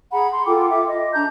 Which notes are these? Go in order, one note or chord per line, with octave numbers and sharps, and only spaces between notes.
G#4 F#5 A#5 B5
C6
F4 A4 G5 D6
E5 D6
D#5
D4 A5 A#5 G6